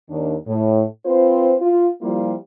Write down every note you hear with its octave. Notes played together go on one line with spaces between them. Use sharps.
D#2 D#3 D4
A2
C4 F4 B4 C5
F4
F3 G3 A#3 E4 F4 G4